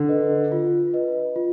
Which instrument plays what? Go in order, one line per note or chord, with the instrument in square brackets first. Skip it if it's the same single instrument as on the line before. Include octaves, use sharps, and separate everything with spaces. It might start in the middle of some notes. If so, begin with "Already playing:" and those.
Already playing: [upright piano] D3
[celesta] B4 D#5
F4
B4 D#5
F4